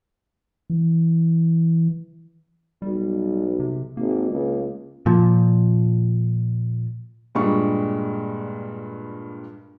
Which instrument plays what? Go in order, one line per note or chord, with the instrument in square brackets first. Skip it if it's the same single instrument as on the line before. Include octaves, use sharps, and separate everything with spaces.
[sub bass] E3
[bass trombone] B1 [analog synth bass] G3
[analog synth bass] C3
[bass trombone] G#1 [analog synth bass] A#3
[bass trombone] C#2
[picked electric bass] A#2 F3
[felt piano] G2 A#2 G3 G#3 C#6